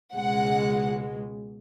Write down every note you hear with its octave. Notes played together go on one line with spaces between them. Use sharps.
C#2 B2 G#3 F#5